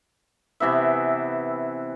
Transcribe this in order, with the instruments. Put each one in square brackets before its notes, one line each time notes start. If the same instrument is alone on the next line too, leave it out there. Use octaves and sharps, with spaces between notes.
[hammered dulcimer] C3 E3 B3 E5